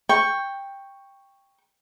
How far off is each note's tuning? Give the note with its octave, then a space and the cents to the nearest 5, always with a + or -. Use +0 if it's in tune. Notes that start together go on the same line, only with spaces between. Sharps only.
G5 +10 C#6 +0